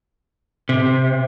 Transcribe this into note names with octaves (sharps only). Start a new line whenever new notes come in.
C3